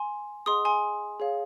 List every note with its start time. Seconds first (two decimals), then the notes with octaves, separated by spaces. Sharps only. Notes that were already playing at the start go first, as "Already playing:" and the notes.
Already playing: G#5 C6
0.46 G#4 D#5 F#5 C6 D#6
0.65 G#5 C6
1.20 G#4 C#5 F5